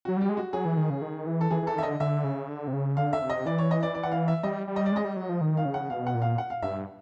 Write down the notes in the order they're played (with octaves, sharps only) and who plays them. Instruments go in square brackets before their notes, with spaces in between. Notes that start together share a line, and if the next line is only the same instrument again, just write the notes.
[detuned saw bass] F#3 [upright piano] F#4
[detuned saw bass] G3 [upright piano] G4
[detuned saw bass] G#3
[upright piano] F#4
[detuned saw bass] F#3 [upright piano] G#4
[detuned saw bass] E3
D#3
C#3
D#3
E3
[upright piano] A4
[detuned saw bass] E3 [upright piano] G#4
[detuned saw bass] E3 [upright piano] A4
[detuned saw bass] D#3 [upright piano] E5
[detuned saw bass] D3 [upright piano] D#5
[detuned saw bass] D3 [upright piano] E5
[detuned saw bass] C#3
D3
C3
C#3
[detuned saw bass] D3 [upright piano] F5
[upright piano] E5
[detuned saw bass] C3
[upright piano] D#5
[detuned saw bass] E3 [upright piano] D5
[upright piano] C#5
D#5
D5
D5
F#5
F5
E5
[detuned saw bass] G3 [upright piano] D#5
[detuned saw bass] G3
[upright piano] D#5
D5
[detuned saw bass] G#3 [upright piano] D#5
[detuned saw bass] G3
F#3
F3
D#3
[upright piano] F5
[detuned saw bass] C#3
[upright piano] F#5
[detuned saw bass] B2 [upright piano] F5
[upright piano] F#5
[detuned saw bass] A#2
[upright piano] F5
F#5
F5
[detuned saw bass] G2 [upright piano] E5